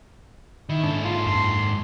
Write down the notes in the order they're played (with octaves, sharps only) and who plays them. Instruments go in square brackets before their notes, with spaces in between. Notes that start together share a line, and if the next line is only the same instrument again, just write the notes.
[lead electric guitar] D#3 [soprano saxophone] E4
[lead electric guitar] G#2 A4 [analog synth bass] D4
[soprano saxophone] F4
[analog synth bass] F#2 [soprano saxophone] C6